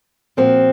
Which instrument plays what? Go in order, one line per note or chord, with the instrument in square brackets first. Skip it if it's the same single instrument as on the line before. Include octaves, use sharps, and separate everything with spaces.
[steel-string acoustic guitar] A#2 F3 C4 F#4